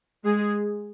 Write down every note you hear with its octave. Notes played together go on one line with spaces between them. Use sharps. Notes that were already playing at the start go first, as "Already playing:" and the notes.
G#3 G#4